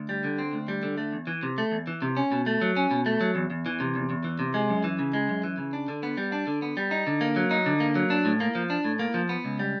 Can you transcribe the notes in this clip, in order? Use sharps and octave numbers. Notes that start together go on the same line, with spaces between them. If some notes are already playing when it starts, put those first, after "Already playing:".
Already playing: D2
G3
D3
C4
D2
G3
D3
A3
E2
E3
C3
A3
E2
E3
C3
C#4
B2
A3
F#3
C#4
B2
A3
F#3
E2
E2
E3
C3
E2
E2
E3
C3
G#3
F#2
E3
C#3
G#3
F#2
E3
C#3
D4
D3
B3
G3
D4
D3
B3
G3
D#4
D3
A#3
F#3
D#4
D3
A#3
F#3
D4
A2
A#3
F3
D4
A2
A#3
F3
B3
C#2
G3